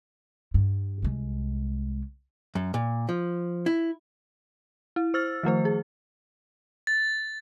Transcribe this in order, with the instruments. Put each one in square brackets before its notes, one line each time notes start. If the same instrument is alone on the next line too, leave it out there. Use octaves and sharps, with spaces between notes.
[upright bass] G2
C2 G#3
[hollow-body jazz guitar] F#2
A#2
F3
E4
[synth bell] E4
C5 E6 F6 A6
D#3 F3 A3 C5
G#4
[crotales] A6